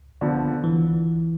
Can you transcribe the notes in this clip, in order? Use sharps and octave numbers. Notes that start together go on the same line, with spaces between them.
D3 F3 B3
E3